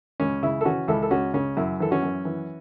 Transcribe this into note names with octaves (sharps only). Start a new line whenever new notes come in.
C#2 C#4
C#3 E4
A4
E3 C#4 F#4
C#2 E4 A4
A4
C#2 C#4 F#4
C#3 C#4
F#2 E4
E3 A4
C#4 F#4
F#2
E3